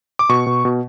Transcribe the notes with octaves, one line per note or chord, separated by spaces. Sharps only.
D6
B2 C#6
B2
B2